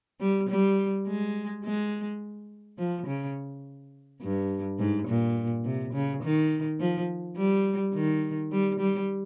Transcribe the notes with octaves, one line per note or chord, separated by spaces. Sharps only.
G3
G3
G#3
G#3
F3
C#3
G2
G#2
A#2
C3
C#3
D#3
F3
G3
D#3
G3
G3